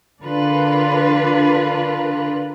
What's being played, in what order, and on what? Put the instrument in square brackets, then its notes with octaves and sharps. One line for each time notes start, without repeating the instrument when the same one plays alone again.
[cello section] D3 D4 F4 A#4 B4